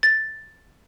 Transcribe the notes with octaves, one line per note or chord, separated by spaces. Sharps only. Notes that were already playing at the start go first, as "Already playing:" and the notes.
A6